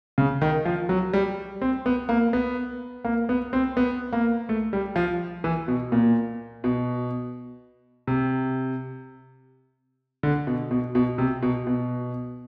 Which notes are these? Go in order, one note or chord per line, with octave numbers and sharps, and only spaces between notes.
C#3
D#3
F3
F#3
G3
C4
B3
A#3
B3
A#3
B3
C4
B3
A#3
A3
G3
F3
E3
B2
A#2
B2
C3
D3
B2
B2
B2
C3
B2
B2